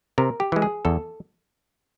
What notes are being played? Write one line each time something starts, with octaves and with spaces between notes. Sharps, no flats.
C3 A#4
G4
E3 G#3
G#4
E2 A4